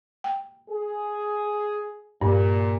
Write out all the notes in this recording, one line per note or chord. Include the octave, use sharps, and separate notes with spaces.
G5
G#4
G2 A#2